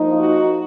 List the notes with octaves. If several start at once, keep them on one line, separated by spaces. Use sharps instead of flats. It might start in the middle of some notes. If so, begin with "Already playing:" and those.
Already playing: F3 A#3 D#4
F#4